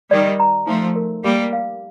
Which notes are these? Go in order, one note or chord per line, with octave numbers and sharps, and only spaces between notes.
D#3 G3 D5
A#5
F3 A3 D#4
A#4
G3 A#3 G4
F5